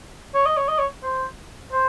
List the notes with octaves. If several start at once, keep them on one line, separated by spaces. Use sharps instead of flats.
C#5
D#5
C#5
D#5
C#5
C5
C5